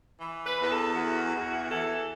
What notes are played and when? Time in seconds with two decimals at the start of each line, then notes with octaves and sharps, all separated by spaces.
0.20 E3
0.45 B4
0.59 E2 B4
0.71 A4
0.95 E3 F#4
1.33 E2
1.70 E3 A4